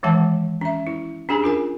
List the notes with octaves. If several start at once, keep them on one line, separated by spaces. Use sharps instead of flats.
D#3 E3 G#3 F#5 A5
C#4 E5
E4
C#4 D4 G4 G#4 G#5
D4 F4 A#4 G#5